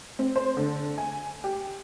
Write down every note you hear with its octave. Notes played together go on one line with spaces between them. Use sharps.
C4
C5
D3
G#5
G4